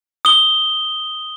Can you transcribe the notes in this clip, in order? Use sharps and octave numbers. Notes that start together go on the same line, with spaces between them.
D#6 G7